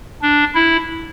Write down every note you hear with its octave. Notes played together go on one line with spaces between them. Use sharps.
D4
E4